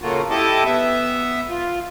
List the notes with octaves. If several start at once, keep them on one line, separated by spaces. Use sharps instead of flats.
C#3 A3 A#3 F4 F#4
E4 G4 A4 D#5 A5 D6
B3 E5
F4